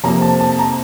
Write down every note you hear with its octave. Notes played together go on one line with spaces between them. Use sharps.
F2 C3 F3 A#3 A#5
A5
A5
A#5